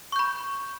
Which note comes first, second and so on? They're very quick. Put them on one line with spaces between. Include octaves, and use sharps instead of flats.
C#6 G6 B5